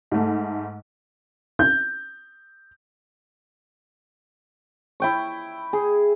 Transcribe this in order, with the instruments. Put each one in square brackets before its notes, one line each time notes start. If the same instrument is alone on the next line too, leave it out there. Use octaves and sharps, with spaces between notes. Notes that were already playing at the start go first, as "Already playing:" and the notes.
[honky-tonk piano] G#2 A3
[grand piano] G6
[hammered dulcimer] E4 G5 C#6
G#4